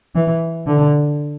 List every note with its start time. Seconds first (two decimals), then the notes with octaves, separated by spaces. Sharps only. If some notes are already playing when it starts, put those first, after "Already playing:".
0.15 E3
0.67 D3